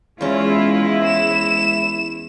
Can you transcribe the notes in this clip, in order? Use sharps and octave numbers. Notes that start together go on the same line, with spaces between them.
E2 G#3 C#4 E4 F4
E7